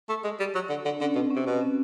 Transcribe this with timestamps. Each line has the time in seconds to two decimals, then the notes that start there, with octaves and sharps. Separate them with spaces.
0.09 A3
0.24 G#3
0.40 G3
0.55 F#3
0.69 D3
0.85 D3
0.91 D4
1.00 D3 C#4
1.15 B2 C4
1.30 C#4
1.36 C3
1.46 B2 C4
1.61 C#4